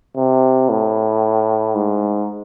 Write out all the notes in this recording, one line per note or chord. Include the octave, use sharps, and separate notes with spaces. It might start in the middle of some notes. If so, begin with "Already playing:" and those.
C3
A2
G#2